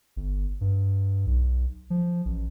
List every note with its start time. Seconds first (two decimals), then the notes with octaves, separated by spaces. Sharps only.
0.16 G1
0.61 G2
1.26 B1
1.90 F3
2.25 A1